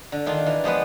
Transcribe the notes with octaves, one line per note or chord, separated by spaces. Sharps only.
D3
D#3 D4 F4
E3
F3 G#3 B3 B4